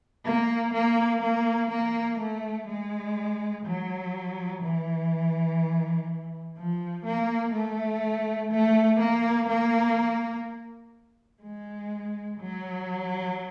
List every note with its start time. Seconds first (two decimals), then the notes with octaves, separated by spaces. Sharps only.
0.25 A#3
0.73 A#3
1.21 A#3
1.70 A#3
2.19 A3
2.67 G#3
3.65 F#3
4.62 E3
6.57 F3
7.05 A#3
7.53 A3
8.51 A3
8.99 A#3
9.48 A#3
11.43 G#3
12.39 F#3